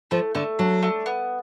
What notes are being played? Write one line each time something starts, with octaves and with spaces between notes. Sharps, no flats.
F3 A3
D3 A3
F#3 D4
A3
B3